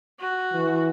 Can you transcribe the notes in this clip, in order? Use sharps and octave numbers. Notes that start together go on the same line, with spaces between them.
F#4
E3